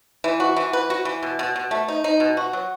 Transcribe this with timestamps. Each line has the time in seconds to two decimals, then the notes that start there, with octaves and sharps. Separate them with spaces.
0.24 E3
0.40 F#4
0.57 E3
0.73 B4
0.90 F#4
1.05 E3
1.23 B2
1.39 B2
1.56 B2
1.71 A3
1.88 D#4
2.04 D#4
2.20 B2
2.37 F#4
2.53 F#3